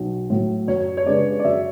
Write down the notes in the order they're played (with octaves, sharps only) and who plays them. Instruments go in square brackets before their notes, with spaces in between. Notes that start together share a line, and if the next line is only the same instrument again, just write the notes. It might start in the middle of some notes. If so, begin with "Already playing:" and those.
Already playing: [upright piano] B1
A2 F#3
[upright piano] F#2 [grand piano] C#5
[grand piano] C#5
[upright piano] C#3 G#3 B3 D4 [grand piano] D5
[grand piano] D5
[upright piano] F#2 [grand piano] E5